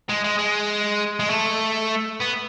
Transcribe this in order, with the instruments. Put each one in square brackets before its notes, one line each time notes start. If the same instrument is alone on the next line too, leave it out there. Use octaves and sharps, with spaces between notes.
[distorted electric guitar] G#3
G#3
G#3
G#3
A3
B3